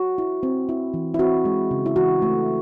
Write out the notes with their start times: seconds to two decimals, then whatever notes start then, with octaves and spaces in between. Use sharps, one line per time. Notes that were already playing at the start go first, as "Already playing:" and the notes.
Already playing: F#4
0.18 E4
0.43 C4
0.69 E4
0.94 E3
1.14 E4
1.19 C4 F#4
1.45 G#3
1.71 C#3
1.86 E4
1.96 E3 F#4
2.22 A3